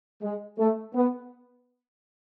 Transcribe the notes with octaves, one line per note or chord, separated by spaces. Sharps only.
G#3
A3
B3